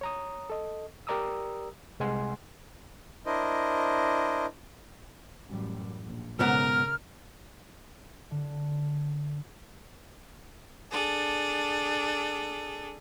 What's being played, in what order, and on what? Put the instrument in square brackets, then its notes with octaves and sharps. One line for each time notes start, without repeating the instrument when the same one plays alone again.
[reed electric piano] C#5 A#5 D#6
A4 D#5
G4 A#4 D5 A#5 D#6 E6
C2 C3 G#3 F#5 G#5 C6
[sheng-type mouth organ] D4 E4 A#4 C5 D#5
[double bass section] A1 F#2 G3
A#1
[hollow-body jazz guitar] B1 G#2 B3 [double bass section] C#3 [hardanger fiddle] A#4 [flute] F6
[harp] D3
[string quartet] D4 G#4 A4